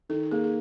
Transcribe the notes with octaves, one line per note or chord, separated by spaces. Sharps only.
D#3 A4
A#3 G#4
G#4